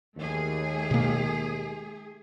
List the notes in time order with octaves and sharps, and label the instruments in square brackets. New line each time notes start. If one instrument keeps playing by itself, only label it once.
[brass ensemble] D#2 [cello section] A3 G#4
[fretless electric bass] B2 A#3